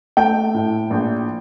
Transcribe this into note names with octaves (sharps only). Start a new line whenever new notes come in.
A3 G5
A2
A#1